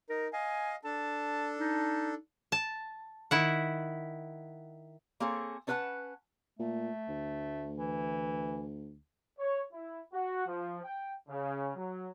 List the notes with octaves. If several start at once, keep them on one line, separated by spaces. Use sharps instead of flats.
D#4 A#4
D#5 F5 G#5
D4 A4 A5
D#4
A5
D#3 E4 F#5
A#3 C4 G#4 A4 C#5
C#4 D4 B4 C5 F#5 A5
A#2 A3
D2
E3
C#5
E4
F#4
F3
G5
C#3
F#3